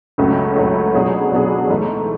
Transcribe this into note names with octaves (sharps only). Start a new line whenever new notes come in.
C#2 C#3 F#3 A3
C#2 C#3 F#3 A3
B2 F#3 B3 D4 G#4
B2 F#3 B3 D4 G#4
G#2 E3 A3